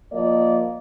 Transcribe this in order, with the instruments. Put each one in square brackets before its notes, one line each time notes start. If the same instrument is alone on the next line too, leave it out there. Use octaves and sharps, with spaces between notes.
[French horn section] F3 A#3 D5 D#5